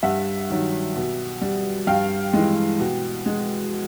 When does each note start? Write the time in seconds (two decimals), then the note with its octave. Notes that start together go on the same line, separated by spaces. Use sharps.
0.03 G2 E5 F#5
0.49 D#3 F#3
0.96 B2
1.41 G3
1.87 G2 F5 G5
2.33 E3 G#3
2.80 B2
3.26 G#3